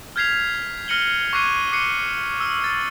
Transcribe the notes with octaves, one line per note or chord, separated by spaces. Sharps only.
F6 G6 G#6 B6 C7 F7
F6 A#6 C#7 D#7 F#7 G7
C#6 D6 F#6 G#6 C7 D#7
D6 F#6 C7 C#7 D#7 G7
E6 F6
E6 A6